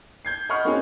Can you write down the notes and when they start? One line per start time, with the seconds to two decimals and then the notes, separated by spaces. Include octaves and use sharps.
0.25 G6 G#6 C7
0.49 D#5 F#5 B5 C#6 F6
0.65 A#3 C4 C#4 D#4 F#4 G#4